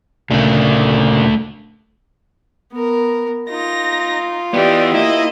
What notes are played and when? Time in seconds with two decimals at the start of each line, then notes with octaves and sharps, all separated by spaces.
0.31 A#2 C#3 A3 A#3 D4
2.72 B3 A#4
3.50 D#4 F4 A#6
4.54 E3 B3 G4 D5 D#5
4.94 A#3 E4 D#5